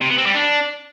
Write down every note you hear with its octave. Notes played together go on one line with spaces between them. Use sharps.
C3
B3
C4
G3
D4